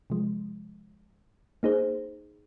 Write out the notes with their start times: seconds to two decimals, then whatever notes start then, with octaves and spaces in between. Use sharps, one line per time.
0.10 C3 F3 G#3
1.63 A#3 D#4 G#4 C5